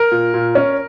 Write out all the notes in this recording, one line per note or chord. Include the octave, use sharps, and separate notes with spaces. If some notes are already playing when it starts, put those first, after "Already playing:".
Already playing: A#4
A#2
A#2
C#4